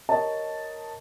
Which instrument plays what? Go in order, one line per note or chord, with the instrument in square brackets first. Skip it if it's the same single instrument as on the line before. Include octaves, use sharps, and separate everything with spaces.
[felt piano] G4 A#4 C#5 D#5 A5